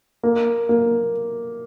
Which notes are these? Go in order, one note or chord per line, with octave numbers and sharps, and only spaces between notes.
A#3
A#3